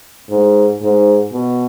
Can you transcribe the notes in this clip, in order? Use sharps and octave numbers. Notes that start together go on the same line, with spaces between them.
G#2
G#2
B2